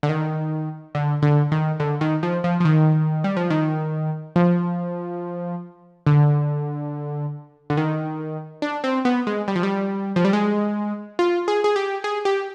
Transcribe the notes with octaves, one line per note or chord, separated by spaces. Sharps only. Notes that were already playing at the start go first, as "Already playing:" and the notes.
D3
D#3
D3
D3
D#3
D3
D#3
F3
F3
F3
D#3
G3
F3
D#3
F3
D3
D3
D#3
D4
C4
B3
G#3
G3
F3
G3
F3
G3
G#3
F4
G#4
G#4
G4
G#4
G4